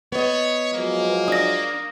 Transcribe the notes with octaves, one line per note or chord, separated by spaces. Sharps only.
B3 C#5 D#5
F3 F#3 G#3 A#3
D4 D#6 A#6